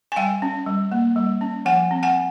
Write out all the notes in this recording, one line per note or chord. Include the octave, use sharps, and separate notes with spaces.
G#5
G3 F5 G5
C#4
G3
A#3
G3
C#4
F3 F#5 G#5
C4
F#5 G#5